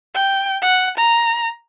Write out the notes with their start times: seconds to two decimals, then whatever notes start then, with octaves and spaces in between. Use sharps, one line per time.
0.15 G5
0.62 F#5
0.97 A#5